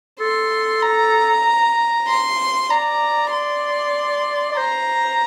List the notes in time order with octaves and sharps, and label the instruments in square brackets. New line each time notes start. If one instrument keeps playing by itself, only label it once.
[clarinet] A4 [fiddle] C6
[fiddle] A#5
C6
[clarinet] D5 [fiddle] A#5
[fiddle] C6
[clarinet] D5
[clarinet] C5 [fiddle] A#5